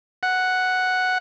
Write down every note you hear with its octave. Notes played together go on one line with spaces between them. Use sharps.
F#5